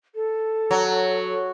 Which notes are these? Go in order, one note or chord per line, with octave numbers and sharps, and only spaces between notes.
A4
F#3